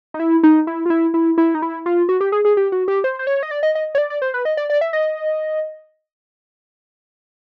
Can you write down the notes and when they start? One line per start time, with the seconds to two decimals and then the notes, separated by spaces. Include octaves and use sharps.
0.14 D#4
0.20 E4
0.43 D#4
0.67 E4
0.86 F4
0.90 E4
1.14 E4
1.38 E4
1.55 D#4
1.62 E4
1.86 F4
2.09 F#4
2.21 G4
2.32 G#4
2.45 G#4
2.57 G4
2.72 F#4
2.88 G4
3.04 C5
3.19 C5
3.27 C#5
3.43 D#5
3.51 D5
3.63 D#5
3.75 D#5
3.95 C#5
3.98 D5
4.10 D5
4.22 C5
4.34 B4
4.45 D#5
4.57 D5
4.70 D5
4.81 E5
4.93 D#5